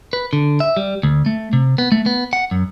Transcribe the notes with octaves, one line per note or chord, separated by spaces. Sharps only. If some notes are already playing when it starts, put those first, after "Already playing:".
B4
D3
E5
G3
D2
A3
C3
B3
A3
B3
F#5
F#2